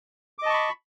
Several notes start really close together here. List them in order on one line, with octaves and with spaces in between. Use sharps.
D6 D#5 A5 C#6 B5